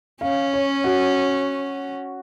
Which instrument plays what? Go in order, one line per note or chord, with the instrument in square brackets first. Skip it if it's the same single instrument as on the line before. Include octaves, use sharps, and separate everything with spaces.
[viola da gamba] C#4 [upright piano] F5
[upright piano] C#5
F#4